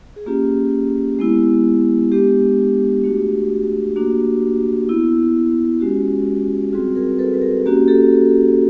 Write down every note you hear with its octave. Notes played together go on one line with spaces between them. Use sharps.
G#4
A#3 C#4 F4 G4
G#3 B3 E4
G#3 B3 D4 G4
A3 D4 F#4
A#3 D4 F#4
B3 E4
G#3 C#4 F#4 G4
G3 C4 F4 F#4 G#4
G#4 A#4
A4 B4
B4
G#4 A#4
A#3 C#4 F#4 G4
G4 A4